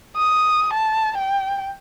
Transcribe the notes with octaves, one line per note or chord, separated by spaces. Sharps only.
D#6
A5
G5